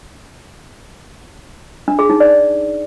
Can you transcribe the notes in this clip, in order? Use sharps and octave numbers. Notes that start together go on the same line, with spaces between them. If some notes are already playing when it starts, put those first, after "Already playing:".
D4
G#4
D#4
D5